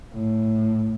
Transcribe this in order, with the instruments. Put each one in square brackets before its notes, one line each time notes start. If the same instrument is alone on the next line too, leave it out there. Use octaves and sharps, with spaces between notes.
[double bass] A2